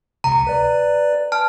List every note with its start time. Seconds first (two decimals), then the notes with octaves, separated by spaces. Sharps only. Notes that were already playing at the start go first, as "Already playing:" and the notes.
0.24 C#2 C3 A#5
0.47 B4 D5
1.32 A5 F6